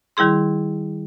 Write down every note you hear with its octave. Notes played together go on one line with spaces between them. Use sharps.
D#3 G3 E4 G#4 C6